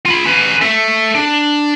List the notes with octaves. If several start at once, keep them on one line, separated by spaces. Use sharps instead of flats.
F4 B5
C#4 B4
A4 E5
D4